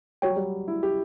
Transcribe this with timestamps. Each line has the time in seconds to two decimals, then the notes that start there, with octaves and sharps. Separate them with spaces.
0.22 G3 F#4 C#5 G5
0.30 F#3
0.36 G3
0.68 E4
0.83 G4